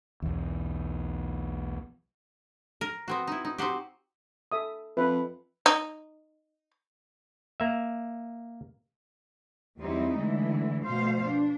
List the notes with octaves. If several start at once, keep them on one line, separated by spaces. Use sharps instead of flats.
B1 E2
A#4
B3 C4 F#4
D#4 E4
D#4
C4 D#4 F#4 G4
A4 E5 D#6
F2 B4 E5
D#4
A#3 E5
E2 F#3 G3 C4 D#4 E4
D3 E3 G#3 A3 E4
B2 F3 A3 C5 F5
D4